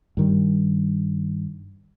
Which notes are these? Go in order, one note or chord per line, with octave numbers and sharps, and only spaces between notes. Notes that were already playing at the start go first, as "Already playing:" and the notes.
G2 D#3 G3